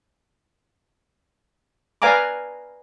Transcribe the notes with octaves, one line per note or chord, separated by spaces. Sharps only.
B4 D5 F5 G#5 A#5 D6